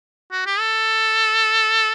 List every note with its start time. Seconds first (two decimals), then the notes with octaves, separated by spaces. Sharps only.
0.31 F#4
0.46 G4
0.59 A4